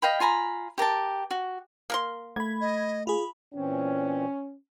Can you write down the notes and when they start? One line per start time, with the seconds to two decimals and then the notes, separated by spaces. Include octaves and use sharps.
0.02 D#5 F5 G5 B5
0.20 F4 G#5 A#5 B5
0.78 G4 A#4 G5 A5
1.31 F#4
1.90 A#3 A#4 C6
2.36 A3 B5 G#6
2.61 D#5
3.07 F4 G#4 B5
3.54 A#2 E3 C4 C#4